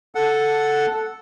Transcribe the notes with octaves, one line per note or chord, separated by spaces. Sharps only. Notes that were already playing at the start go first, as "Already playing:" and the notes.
A4 F#5